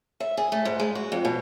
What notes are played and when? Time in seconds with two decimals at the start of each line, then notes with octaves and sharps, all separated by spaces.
0.20 E5
0.37 G#4
0.52 A3
0.65 G#2
0.80 G#3
0.95 F#4
1.12 F2
1.25 B2